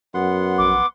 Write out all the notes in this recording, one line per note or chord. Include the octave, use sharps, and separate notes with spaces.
F#2 B3 F#5 C6
A#1 D6